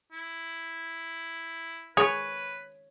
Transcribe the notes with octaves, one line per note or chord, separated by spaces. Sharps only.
E4
G#4 B4 C#5